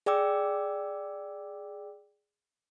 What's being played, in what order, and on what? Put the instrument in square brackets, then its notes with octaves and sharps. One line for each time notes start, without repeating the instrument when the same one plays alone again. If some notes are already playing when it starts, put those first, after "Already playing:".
[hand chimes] G#4 D5 G5 D6 E6